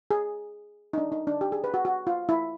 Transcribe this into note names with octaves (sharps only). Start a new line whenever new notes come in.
G#4
D#4
D4
D#4
D4
G4
G#4
B4
F#4
F#4
F4
E4